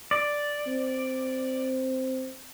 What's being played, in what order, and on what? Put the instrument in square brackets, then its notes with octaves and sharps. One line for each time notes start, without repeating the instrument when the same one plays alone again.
[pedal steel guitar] D5
[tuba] C4